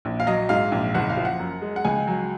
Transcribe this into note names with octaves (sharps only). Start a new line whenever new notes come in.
A#1
F5
F#3 D#5
G#2 F5
A#1
F#1 F#5
F5
F3
F#5
F#2
G#3
F#5
C#2 G#5
F#3